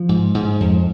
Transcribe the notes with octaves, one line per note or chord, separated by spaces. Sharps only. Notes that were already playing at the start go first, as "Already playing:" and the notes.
Already playing: F3
G#2
G#2
F2